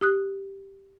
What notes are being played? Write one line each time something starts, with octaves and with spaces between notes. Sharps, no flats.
G4 D#6 F#6